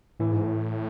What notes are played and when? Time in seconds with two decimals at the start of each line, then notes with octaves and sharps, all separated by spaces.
0.20 A2 E3
0.32 G#2
0.43 A2